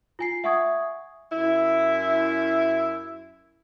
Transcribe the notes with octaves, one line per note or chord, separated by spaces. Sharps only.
F4 G#5 C7
E5 F#5 G#5 C#6 D#6 G#6
F#2 E4